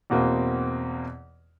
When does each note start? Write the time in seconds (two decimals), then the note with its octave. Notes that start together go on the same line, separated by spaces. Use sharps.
0.10 E2 B2 A#3 C4